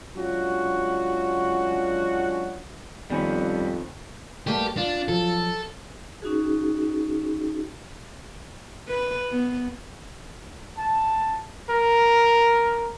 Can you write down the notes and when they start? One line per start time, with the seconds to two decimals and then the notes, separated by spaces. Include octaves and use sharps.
0.17 F#3 G#3 C#4 D4 F4 F#4
3.10 F2 D#3 G3 B3 C#4 G#5
4.47 G2 A3 A#3 G4
4.77 D4 F4
5.08 F3 F#3 A4
6.22 C#4 D#4 F#4 G#4
8.88 B4
9.31 B3
10.78 A5
11.70 A#4